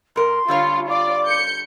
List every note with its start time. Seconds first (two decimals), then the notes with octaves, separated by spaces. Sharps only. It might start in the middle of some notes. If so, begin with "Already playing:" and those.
0.16 G#2 A#4 C6
0.48 D3 G3 F4 C#5
0.89 F4 D5 D6
1.27 G6 C#7